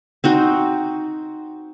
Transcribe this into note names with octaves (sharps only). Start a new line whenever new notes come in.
C4 D#4 F#4